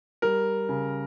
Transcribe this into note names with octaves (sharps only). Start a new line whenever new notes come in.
G3 A#4
C#3